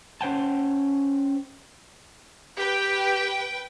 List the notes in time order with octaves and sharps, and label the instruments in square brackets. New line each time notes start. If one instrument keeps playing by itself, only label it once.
[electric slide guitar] C#4 C5 F#5 G5 A5
[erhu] G4 [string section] B4 G5